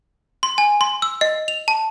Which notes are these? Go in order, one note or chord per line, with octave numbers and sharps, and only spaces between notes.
C6
G#5
C6
E6
D#5
F7
A5